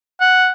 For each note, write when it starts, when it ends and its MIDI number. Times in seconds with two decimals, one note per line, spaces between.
0.21 0.50 78